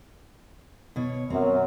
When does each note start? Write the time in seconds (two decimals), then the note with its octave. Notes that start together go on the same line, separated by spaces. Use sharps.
0.96 B2 C#5
1.30 F#2 C4